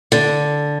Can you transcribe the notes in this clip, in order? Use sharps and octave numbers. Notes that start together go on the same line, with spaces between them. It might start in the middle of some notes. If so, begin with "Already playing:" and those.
D3